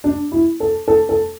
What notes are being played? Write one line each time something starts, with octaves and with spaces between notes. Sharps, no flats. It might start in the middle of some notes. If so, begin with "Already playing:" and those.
D4
E4
A4
A4
A4